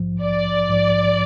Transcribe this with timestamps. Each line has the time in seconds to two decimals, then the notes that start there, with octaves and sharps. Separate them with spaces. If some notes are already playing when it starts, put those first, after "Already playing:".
Already playing: A#1 G#2 F3
0.21 A#1 D5
0.69 G#2 F3